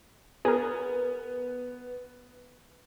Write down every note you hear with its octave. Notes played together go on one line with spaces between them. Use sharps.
B3 G#4 A#4